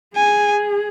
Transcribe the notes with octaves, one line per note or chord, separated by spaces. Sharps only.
G#4 G#5